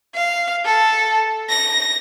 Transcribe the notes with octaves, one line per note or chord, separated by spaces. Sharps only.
F5
A4
A#6